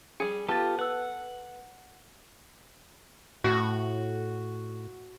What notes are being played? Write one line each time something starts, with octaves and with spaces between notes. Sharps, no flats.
G3 G#4 C#7
B3 F4 G4 A4 A5 A6
B4 F#5 E6
A2 F#4